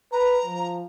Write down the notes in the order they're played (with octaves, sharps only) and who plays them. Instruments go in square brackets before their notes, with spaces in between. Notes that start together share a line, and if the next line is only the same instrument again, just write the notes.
[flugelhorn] B4 [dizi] A#5
[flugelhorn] F3